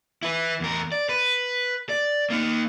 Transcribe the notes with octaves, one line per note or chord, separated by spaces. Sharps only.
E4 B4
E2 A#4
D5
B4
D5
A#3 D#4